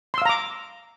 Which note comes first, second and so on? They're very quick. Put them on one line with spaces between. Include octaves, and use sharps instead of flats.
C6 E6 F5 A#5 D6